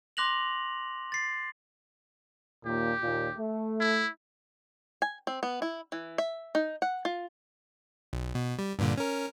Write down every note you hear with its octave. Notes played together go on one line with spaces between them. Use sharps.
C6 D6 F#6 A#6 F7 F#7
A6 C7
D#2 A#2 G4
D#2 A#2
A3
E4
G#5
C4
B3
E4
E3
E5
D#4
F#5
F4
B1
B2
G3
G2 A#2 D3
C#4 A#4